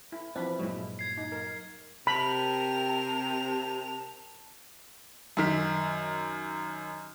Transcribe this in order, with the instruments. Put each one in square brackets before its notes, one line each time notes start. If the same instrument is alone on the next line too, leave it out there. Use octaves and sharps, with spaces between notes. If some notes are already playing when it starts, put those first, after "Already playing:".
[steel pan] E4
[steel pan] E3 F3 D4 [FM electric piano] C4 B5
[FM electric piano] G2 A#2 F#3 [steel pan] G#3 E4
[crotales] G#6 C7
[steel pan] D#4
A#4
[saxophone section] C3 [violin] A#4 F7 [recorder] A5 [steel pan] B5
[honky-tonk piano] F#2 D#3 B6